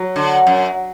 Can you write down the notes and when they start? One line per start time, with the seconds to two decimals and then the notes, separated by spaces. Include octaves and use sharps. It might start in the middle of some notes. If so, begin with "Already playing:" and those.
Already playing: F#3
0.16 D3
0.47 F#2